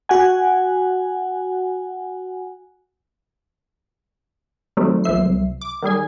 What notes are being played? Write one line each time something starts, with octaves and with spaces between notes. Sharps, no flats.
F#4 F#5 G#5
D#3 F#3 G3 A3 C4
B1 F3 E5 C7
C2
D6
D#3 G3 G#4 G#5